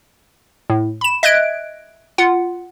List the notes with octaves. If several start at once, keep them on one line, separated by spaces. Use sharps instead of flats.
A2
B5 E7
D#5 E5 F#6 G#6 D7
F4 F#5